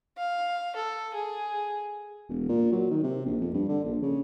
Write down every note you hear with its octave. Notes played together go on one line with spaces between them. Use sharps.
F5
A4
G#4
E1
A#2
F#3
D#3
C3
A#1
F2
G2
D3
A#1
C#3